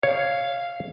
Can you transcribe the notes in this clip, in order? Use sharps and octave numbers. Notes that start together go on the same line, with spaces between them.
C#5 F5